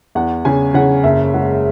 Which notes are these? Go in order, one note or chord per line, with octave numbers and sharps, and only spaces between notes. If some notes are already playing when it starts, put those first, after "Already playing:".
E2 F#5
C#3 G#5
C#3 F#5
F#1 E5
G#3 F#5